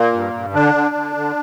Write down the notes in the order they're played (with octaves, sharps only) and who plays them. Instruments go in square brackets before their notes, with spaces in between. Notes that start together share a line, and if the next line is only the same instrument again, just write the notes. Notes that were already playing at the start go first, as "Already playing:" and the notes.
Already playing: [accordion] A#2 A#3
G2
G2
D3 D4
D3
D3
D3